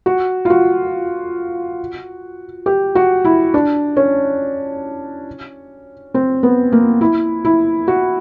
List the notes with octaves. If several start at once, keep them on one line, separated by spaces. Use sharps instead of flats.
F#4
F4
F#4
G4
F#4
E4
D4
C#4
C4
B3
A#3
E4
E4
F#4